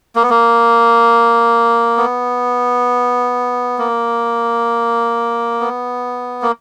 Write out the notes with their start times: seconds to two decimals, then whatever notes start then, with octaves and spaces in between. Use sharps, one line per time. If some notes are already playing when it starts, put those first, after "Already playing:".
0.16 A#3
0.23 B3
0.30 A#3
1.97 B3
3.79 A#3
5.61 B3
6.42 A#3